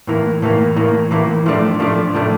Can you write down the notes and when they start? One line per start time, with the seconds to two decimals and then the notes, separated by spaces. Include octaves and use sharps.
0.07 A2 E3 A#3
0.42 A2 E3 A#3
0.76 A2 E3 A#3
1.11 A2 E3 A#3
1.46 A2 F3 A3 D4
1.80 A2 F3 A3 D4
2.15 A2 F3 A3 D4